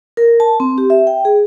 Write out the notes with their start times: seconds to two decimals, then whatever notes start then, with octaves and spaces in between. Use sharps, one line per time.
0.17 A#4
0.40 A5
0.60 C4
0.78 G4
0.90 E5
1.07 G5
1.25 G#4